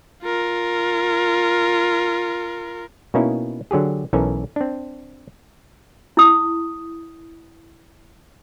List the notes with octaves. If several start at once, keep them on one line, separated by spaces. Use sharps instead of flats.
F4 A#4
B2 A#3 C#4 D#4 E4
D3 F#3 G4 G#4
B1 E3 C#4 A4 A#4 G#5
C4 D4
E4 D#6